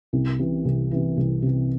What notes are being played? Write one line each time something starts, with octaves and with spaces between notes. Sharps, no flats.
C2
C3 E3
C2
C3 E3
C2
C3 E3